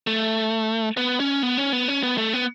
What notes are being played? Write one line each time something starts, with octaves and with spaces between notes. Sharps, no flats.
A3
B3
C#4
B3
C#4
B3
C#4
B3
A3
B3